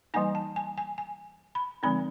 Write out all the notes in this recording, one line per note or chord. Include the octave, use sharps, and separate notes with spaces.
E3 G3 A#3 D#4 G#5
A5
G#5
G#5
G#5
B5
D3 F3 G#3 C4 D#4 B5